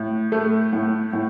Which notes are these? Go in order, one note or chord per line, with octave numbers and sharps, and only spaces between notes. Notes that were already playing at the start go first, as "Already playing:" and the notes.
Already playing: A2
A3
A2
A2